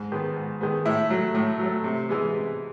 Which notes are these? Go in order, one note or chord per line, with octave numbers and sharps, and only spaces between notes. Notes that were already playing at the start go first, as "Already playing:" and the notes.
Already playing: G#2
D#3 G#3 B3
G#2
D#3 G#3 B3
A2 E4
F#3 A3
A2
F#3 A3
C3
E3 G#3 B3
C3